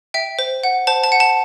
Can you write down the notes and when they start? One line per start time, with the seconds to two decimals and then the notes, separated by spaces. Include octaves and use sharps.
0.14 E5 G5
0.39 C5
0.64 F#5
0.87 C5 A5
1.04 A5
1.12 F#5
1.20 A5